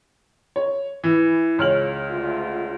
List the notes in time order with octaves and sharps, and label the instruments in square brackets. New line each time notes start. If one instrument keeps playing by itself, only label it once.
[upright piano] C#5
E3
[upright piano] C#2 F6 F#7 [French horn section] C#5
[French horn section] D2 F4